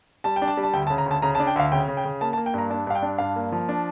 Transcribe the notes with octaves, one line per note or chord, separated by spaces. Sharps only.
G3 A5
G5
D4
A5
G3
A5
D2 G5
A5
C#3
A#5
D2 A5
C#3 A#5
A5
D4
G5
D2 F5
C#3 G5
C#3
G5
C#3
A#3 A5
A5
A#3
G5
G2 A#5
D4 A5
G2 F5
G5
D4
G2 F5
A#3
F3
D4